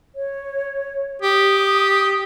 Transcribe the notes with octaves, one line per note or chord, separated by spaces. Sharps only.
C#5
G4 D#6